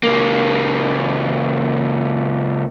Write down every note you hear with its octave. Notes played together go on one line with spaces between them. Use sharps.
C#2 A#3